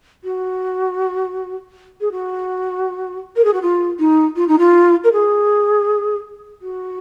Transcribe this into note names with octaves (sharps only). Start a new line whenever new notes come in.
F#4
G#4
F#4
A#4
G#4
F#4
F4
D#4
F4
D#4
F4
A#4
G#4
F#4